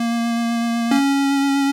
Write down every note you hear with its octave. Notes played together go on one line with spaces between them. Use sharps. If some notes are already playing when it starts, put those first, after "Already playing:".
Already playing: A#3
C#4